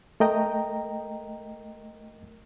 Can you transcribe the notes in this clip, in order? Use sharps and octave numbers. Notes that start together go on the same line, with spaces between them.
A3 A#4 D#5 G5 A#5